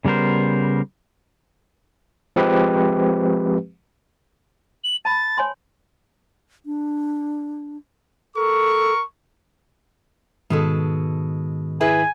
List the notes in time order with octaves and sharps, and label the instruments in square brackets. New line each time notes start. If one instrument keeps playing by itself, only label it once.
[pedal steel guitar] C#3 G3 B3 A#4 C5
[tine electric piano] F3 G#3 C4 G4 B4
[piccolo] F#7
[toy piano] A5 B5 [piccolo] A6
[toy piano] C#5 G#5 C6
[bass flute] D4
[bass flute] A4 [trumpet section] A#4 C#6
[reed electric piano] G#2 D#3 [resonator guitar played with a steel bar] B2 G#3 A4
[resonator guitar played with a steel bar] E4 G#4 B4 [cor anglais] G#5